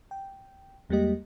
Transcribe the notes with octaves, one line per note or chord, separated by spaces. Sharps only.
G5
E2 G3 G#3 A#3 G4 D#5